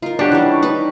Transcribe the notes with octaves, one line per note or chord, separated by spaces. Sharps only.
D#4 F4 A#4
D4 G4 C#5 F#5 G5 A5
E3 G3 C#4
A#5 C#6
D#4 B4